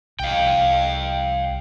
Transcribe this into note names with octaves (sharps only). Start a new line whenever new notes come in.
C2 F5 G5